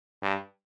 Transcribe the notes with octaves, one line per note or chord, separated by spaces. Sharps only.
G2